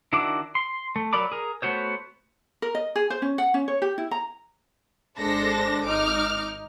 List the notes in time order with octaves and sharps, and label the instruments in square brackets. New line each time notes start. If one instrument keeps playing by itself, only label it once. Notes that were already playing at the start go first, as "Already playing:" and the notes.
[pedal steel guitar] D#3 D4 E4 F#4 D6
C6
A3
F#3 A#4 D5 B5 D6
G#4 A#4
A3 B3 F#4 C5 C#5
[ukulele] A#4
D#5
G#4
C5
C#4
F#5
C#4
C#5
G4
E4
A#5
[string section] G#1 G#3 D4 A4 C5 A#6
G#1 D#4 D6 F6